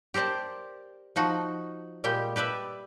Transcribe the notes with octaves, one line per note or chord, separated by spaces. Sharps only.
G4 A#4 C5 D5 A5
F3 D#4 F#4
A#2 G3 G#3 G4 G5
G4 B4 D5 E5